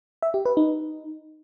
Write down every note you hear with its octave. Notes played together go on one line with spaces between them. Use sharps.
E5
G4
B4
D#4